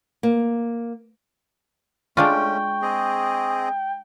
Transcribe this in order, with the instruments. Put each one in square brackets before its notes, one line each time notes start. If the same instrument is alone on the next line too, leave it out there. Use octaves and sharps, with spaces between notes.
[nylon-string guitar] A#3
[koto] G#3 D4 F4 [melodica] A3 C#4 [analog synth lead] G5 [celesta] C#6
[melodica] C4 G#4 D#5